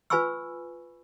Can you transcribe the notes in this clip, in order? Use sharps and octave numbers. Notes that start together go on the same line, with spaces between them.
F4 B4 G#5 B5 C#6 E6